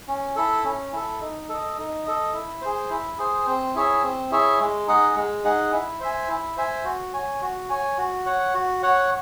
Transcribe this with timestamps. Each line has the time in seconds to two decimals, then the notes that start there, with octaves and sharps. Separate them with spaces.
0.08 C#4
0.36 E4 A4
0.64 C#4
0.93 E4 A4
1.21 D#4
1.49 A4 D#5
1.78 D#4
2.06 A4 D#5
2.34 E4
2.62 G#4 C5
2.90 E4
3.18 G#4 C5
3.46 C4
3.75 E4 G#4 C#5 E5
4.03 C4
4.31 E4 G#4 C#5 E5
4.60 G#3
4.87 D#4 G#4 D#5 F#5
5.16 G#3
5.44 D#4 G#4 D#5 F#5
5.72 E4
6.00 C5 E5 G#5
6.28 E4
6.57 C5 E5 G#5
6.85 F#4
7.13 C#5 G#5
7.42 F#4
7.70 C#5 G#5
7.98 F#4
8.26 C#5 F#5
8.54 F#4
8.83 C#5 F#5